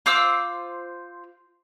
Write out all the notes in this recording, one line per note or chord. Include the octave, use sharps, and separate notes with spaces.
F4 C5 D6 E6